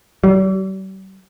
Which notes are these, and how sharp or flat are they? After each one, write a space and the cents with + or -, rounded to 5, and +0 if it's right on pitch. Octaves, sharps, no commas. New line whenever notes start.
G3 -45